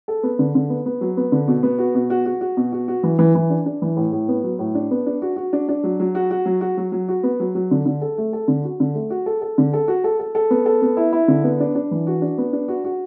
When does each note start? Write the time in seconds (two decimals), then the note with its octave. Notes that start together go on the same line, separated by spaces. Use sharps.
0.08 A4
0.23 B3
0.39 D3
0.55 D3
0.70 B3
0.86 B3
1.01 F#3
1.17 B3
1.32 D3
1.48 B2
1.63 B3
1.78 F#4
1.94 B2
2.10 F#4
2.26 F#4
2.41 F#4
2.57 B2
2.72 F#4
2.88 F#4
3.03 E3
3.19 E3
3.35 E3
3.50 D4
3.66 D4
3.82 E3
3.96 A2
4.12 A2
4.28 B3
4.43 F#3
4.59 A2
4.75 D4
4.91 B3
5.06 D4
5.22 F#4
5.36 F#4
5.53 D4
5.69 D4
5.83 F#3
6.00 F#3
6.15 F#4
6.31 F#4
6.45 F#3
6.61 F#4
6.77 F#3
6.92 F#3
7.08 F#4
7.23 B3
7.40 F#3
7.55 F#3
7.71 D3
7.86 D3
8.01 A4
8.18 A3
8.33 A4
8.48 D3
8.64 F#4
8.80 D3
8.95 A3
9.10 F#4
9.26 A4
9.42 A4
9.58 D3
9.73 A4
9.88 F#4
10.04 A4
10.19 A4
10.35 A4
10.50 B3
10.66 A4
10.82 B3
10.97 E4
11.12 E4
11.28 D3
11.44 B3
11.60 D4
11.75 D4
11.91 E3
12.07 F#4
12.22 D4
12.38 B3
12.53 D4
12.68 F#4
12.84 F#4